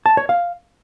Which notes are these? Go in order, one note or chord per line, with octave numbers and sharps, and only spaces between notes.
A5
C#5
F5